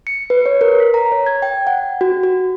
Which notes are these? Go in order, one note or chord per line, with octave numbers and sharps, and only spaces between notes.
C#7
B4
C#5
A#4
B6
A#5
C#5
G#6
G5
F#5
F#4
F#4